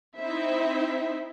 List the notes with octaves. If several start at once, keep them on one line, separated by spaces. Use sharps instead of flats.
C4 D#4 E4 C5 E5